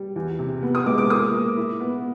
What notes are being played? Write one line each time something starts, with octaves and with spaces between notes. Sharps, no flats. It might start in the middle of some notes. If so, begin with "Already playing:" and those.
Already playing: G3
E2
C3
B3
D#6
G#3 D6
D6
A#3 D#6
A#3
E4
B3